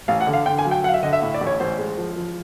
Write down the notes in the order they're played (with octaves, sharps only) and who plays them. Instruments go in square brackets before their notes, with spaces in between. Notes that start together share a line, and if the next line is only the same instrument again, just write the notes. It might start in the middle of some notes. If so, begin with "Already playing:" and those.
[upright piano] A1 F5
F#5
D3
F5
D3 G5
G#5
F#3
G5
F#3 F#5
F5
E5
D3 D#5
E5
A2
D5
A1
C#5
A1 C5
G#3
F3
F3